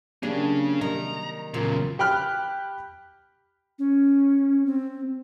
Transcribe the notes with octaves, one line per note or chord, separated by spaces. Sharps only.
F#3 A#3 C#4 D4 G4 G#4
C3 D#3 G3 A#5
E2 A#2 C#3 F#3 F4 A#4
G4 G5 B5 F6 F#6
C#4
C4